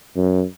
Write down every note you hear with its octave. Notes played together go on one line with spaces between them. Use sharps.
F#2